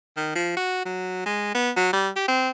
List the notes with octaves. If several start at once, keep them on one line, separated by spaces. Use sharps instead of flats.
D#3
F3
F#4
F#3
G#3
B3
F#3
G3
G4
C4